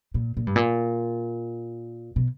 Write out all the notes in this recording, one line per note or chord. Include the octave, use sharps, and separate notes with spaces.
A#2
A#2
G2
A#2
B2